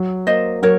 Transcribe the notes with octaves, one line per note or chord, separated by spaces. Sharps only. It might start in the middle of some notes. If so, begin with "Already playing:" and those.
Already playing: F#3
A#3 C5 D#5
F#3 A#4 C#5